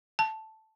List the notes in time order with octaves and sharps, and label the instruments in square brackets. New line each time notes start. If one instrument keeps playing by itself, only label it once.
[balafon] A5